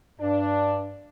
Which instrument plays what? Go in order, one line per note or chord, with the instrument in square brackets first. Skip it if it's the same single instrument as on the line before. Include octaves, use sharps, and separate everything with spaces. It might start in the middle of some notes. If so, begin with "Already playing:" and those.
[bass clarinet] G2 [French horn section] D4